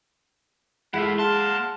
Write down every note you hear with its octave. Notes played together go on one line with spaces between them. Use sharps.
G#3 E4 F4 A4 E5 F#5
A#3 F#5 A5 C6 F6